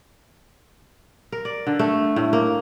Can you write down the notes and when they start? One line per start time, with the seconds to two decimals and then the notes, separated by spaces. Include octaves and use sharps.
1.32 A#4
1.45 D5
1.67 D3
1.79 A3
2.16 A2
2.33 A#3